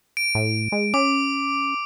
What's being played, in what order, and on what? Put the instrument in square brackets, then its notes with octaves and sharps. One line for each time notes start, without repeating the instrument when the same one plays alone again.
[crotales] D7
[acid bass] A2
G#3
[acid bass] C#4 [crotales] D6